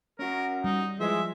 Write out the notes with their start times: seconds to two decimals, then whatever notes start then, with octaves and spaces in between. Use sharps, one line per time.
0.19 C#4 F#4 A#4
0.64 G3 D#4
1.00 E3 F3 G#3 E5